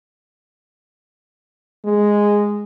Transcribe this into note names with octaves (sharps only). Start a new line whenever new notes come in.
G#3